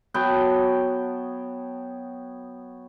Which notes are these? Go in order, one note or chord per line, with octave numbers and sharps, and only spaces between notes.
F#3 B3 G5 A5